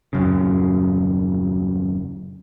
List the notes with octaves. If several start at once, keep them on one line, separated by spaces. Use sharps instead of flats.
D#1 F#2 C#3